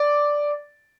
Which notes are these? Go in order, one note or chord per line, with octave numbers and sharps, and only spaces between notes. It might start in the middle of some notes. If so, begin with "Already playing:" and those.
Already playing: D5